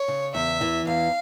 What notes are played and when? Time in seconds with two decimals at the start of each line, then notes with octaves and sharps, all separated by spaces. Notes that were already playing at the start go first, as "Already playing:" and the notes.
Already playing: C#5
0.08 C#3
0.34 E2 E5
0.61 E3
0.87 E2 F5